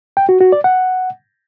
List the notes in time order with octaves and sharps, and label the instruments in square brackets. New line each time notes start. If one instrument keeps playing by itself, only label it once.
[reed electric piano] G5
F#4
F#4
D5
F#5